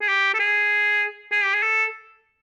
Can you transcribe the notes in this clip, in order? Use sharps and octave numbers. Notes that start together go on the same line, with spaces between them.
G#4
G4
A4
G#4
G#4
G4
G#4
A4